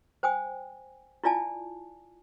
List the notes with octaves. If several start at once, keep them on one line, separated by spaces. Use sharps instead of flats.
C5 G5 G#5 D#6
E4 F4 D5 G#5 A5